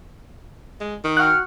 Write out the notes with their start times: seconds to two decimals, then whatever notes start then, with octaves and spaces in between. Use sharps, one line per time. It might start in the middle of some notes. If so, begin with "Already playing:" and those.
0.80 G#3
1.04 D#3
1.17 F#4 F#5 G5 F6